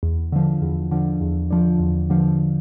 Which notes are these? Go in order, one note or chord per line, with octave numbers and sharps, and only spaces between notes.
E2
D3 F3
E2
D3 F3
E2
D3 F3
E2
D3 F3